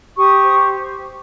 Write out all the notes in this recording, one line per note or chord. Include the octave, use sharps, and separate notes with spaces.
G4 C#6 D#6
C5